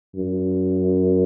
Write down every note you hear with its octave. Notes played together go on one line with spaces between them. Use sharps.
F#2